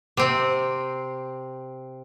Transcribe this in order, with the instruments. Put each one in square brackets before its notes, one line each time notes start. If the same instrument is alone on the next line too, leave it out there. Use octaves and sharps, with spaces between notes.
[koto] C3 C4